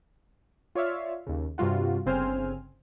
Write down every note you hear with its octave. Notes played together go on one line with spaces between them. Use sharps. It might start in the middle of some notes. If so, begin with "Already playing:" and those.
F4 C#5 D5 E5 F5
D#2 C#3
G2 C3 G3 F4 F#4
G1 C#3 C4 C5 G#5 F6